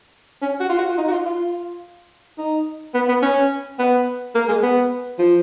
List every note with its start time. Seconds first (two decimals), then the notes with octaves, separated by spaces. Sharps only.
0.42 C#4
0.60 F#4
0.69 F4
0.79 F#4
0.89 F4
0.98 D#4
1.08 F#4
1.12 F4
1.25 F4
2.38 D#4
2.94 B3
3.09 B3
3.23 C#4
3.79 B3
4.35 A#3
4.49 G#3
4.63 B3
5.18 F3